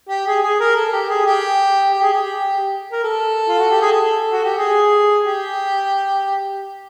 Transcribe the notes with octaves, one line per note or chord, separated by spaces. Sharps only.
G4
G#4
G#4
A#4
A4
G4
G#4
G4
G4
G#4
G4
A#4
A4
F4
F#4
G4
G#4
A4
F#4
G4
G#4
G4